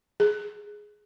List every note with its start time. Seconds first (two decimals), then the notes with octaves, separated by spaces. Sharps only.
0.20 G#4